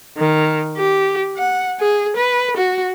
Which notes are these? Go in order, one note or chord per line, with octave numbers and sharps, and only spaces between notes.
D#3
G4
F#5
G#4
B4
F#4